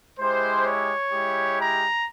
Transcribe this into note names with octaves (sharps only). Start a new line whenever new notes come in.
G#3 E4 G4 C5
C#5
G#3 E4 G4
A#5